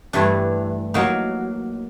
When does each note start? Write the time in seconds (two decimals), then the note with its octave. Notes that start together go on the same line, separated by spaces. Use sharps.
0.13 G2 E3 A3 D4
0.94 F#3 A#3 D#4 F#4